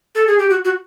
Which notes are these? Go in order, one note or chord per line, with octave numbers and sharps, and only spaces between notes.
A4
G#4
G4
F#4
F#4